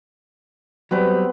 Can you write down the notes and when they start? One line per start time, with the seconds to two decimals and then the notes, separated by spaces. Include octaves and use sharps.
0.91 F#3 G3 B3 C4 B4